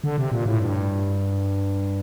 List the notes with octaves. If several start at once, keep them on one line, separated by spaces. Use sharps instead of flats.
D3
C3
A#2
A2
G2